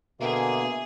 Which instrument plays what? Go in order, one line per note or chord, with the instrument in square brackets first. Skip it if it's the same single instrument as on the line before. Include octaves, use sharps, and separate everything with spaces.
[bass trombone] B2 [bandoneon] D3 A#3 [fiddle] G#4 [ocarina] E5